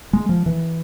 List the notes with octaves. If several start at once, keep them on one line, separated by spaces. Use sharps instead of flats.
G#3
F3
E3